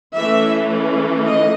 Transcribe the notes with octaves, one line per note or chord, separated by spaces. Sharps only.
E3 A3 C#4 E5
D#5